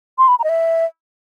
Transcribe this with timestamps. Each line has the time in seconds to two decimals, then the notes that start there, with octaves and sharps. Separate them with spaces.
0.18 C6
0.28 B5
0.39 A#5
0.44 D#5
0.49 E5